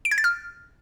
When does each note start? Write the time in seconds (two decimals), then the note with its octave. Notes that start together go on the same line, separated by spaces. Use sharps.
0.05 D7
0.11 G#6
0.18 A6
0.24 F6